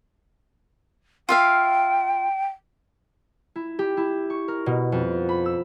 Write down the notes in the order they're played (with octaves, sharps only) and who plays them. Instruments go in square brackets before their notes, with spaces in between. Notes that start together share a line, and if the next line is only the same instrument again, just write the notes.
[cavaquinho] F4 E5 F5 [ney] G5
[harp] E4
G4
E4
C#6
A#4
B2
F2
B5
E6